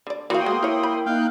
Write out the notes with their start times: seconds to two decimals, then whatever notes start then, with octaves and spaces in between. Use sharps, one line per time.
0.07 D3 D5
0.30 E3 A#3 F#4 F5 G5 C6 D#6
0.46 G#3 B3
0.63 E4 A#4 C#5
0.83 B5
1.06 A#3 D#4 F5 G5 F#6